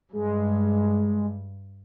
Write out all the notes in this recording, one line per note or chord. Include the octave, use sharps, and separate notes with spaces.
G2 G#3